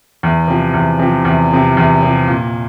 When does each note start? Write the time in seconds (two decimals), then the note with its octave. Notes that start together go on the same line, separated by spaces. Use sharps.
0.23 E2
0.48 C3 F3
0.74 E2
0.99 C3 F3
1.25 E2
1.51 C3 F3
1.77 E2
2.03 C3 F3
2.27 A#2